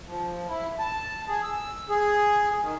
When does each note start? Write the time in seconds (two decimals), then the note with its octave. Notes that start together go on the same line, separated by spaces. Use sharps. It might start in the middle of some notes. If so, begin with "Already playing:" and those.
0.08 F3
0.49 E4
0.79 A5
1.29 G#4
1.43 E6
1.89 G#4
2.62 D#3